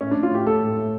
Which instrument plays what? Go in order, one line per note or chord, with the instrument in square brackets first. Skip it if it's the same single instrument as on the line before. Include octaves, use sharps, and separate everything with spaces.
[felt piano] A2 [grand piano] C#4
[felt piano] A2 [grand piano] D4
[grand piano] F4
[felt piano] A2 [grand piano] G4
[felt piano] A3 [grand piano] A4
[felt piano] A2
A2